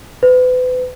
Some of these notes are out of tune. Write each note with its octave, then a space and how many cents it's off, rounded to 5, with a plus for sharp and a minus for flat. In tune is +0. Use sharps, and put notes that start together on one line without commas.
B4 +35